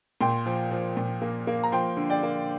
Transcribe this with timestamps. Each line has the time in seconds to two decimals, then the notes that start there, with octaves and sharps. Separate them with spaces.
0.21 A#2 G5 C6
0.46 F3
0.71 F3
0.97 A#2
1.22 A#3
1.47 A#3
1.63 A#5
1.72 F3 G5 C6
1.97 D3
2.10 D5 G5
2.23 A#3